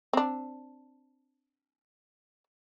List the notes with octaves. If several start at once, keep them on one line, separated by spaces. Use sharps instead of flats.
C4 D4